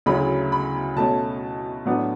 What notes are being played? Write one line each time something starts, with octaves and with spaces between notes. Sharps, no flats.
D2 C#3 F#3 C#4 E4 B5
B5
B2 A3 C#4 A5
A2 F#3 B3 D4